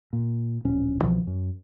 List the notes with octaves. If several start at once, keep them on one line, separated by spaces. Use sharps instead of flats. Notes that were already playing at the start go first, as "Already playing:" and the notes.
A#2
D1 A#1 C#4
C2 B2 E3 F3
F#2